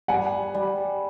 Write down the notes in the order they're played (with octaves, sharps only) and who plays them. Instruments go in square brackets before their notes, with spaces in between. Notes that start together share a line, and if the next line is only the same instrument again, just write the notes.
[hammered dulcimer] G3 [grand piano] F#5 G#5
[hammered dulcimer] G3